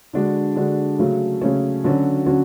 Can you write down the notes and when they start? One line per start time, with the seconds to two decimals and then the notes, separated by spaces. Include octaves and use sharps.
0.13 D3 G#3 D4 F#4
0.56 D3 G#3 D4 F#4
0.99 C#3 F#3 A3 C#4
1.42 C#3 F#3 A3 C#4
1.84 D3 F#3 C#4 F#4
2.26 D3 F#3 C#4 F#4